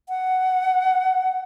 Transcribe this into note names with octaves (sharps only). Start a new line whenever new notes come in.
F#5